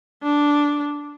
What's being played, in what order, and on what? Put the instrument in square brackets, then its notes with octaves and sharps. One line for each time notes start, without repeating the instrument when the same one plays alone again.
[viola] D4